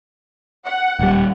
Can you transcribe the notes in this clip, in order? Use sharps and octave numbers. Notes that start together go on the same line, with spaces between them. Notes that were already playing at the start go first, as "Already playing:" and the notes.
F#5
D#1 G3